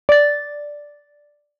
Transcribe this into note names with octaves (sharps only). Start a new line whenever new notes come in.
D5 A6